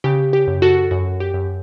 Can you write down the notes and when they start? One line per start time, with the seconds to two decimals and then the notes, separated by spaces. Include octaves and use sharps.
0.04 C#3 G4
0.33 G4
0.47 F#2
0.62 F#4 A4
0.91 F#2 F#4
1.20 G4
1.34 F#2